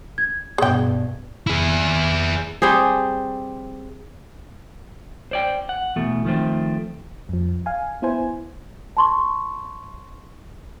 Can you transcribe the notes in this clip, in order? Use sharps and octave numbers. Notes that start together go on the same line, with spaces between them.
G#6
G2 B2 G#4 G5
E4 G#4
G3 C4 G4 G#4
C5 D5 G5
F#5
E2 B2 A3
D#3 F3 A3 C4
F2 F3
F5 G#5
B3 E4 C5 G#5
A5 C6 C#6